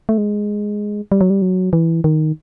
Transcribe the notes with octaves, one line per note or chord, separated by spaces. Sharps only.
A3
G#3
G3
F#3
G3
F#3
E3
D#3